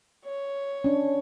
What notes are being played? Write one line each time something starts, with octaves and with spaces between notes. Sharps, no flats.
C#5
C#4 D4